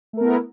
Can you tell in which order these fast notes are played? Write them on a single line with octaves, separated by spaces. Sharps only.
A3 A#4 B3 E4